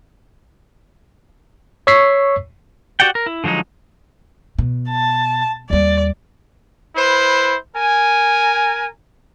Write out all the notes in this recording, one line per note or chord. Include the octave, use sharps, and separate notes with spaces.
C#5 C#6 E6 B6 C7
F#4 G4 D5 F#5 G5
A#4
E4
D3 F3 F#3 G#3 D#4
B2
A5
D#2 G3 D5
E4 B4 C5
A#4 G#5